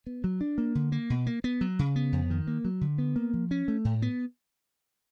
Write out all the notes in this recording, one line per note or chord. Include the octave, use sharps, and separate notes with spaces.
B3
F#3
D4
A#3
D3
A#3
B2
A#3
B3
F#3
C#3
B3
F2
D#3
A#3
F#3
D3
B3
A#3
F3
C#4
A3
A2
B3